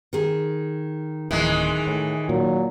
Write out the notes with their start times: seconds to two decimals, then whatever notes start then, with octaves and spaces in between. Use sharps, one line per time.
0.13 D#3 G#4
1.31 D1 D#3 E3 G#3
1.87 A2
2.29 A#2 F#3